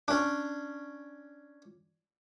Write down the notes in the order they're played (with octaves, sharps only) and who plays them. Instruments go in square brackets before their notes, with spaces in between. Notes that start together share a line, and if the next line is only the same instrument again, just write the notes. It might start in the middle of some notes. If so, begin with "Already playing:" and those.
[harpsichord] C#4 D4